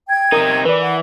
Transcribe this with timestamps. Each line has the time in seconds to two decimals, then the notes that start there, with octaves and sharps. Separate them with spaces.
0.08 G5 G#6
0.32 C3 D#4 A#4 D#6
0.65 E3 B4 D5
0.82 F#5